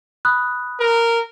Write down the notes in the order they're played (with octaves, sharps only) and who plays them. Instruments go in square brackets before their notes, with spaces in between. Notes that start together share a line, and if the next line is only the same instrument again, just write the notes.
[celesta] B5 D#6 F#6
[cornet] A#4